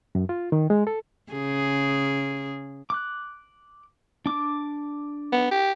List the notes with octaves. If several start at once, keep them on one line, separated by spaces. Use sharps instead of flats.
F#2
F4
D#3
G#3
A4
C#3 G#4
D6 F#6
D4 D6
B3
G4